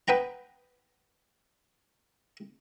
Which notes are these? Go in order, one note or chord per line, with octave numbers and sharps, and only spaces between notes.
B3 B4 G5 A#5